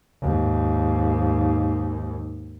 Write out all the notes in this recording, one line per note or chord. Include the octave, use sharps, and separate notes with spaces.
D#2 G#2